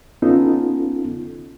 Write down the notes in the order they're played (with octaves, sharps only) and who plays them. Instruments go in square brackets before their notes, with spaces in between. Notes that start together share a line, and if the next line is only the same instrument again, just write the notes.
[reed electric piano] B3 C#4 D#4 F4 A4